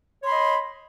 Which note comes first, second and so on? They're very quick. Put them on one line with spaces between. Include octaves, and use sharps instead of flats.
C#5 C6 B5 D#5